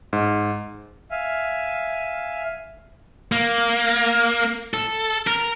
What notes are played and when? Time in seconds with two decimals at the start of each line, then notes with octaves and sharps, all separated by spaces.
0.13 G#2
1.11 E5 F5 G#5
3.32 A#3
4.74 A4
5.27 A#4